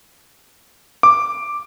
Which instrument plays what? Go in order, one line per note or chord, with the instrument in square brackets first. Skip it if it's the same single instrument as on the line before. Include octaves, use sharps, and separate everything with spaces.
[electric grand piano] D6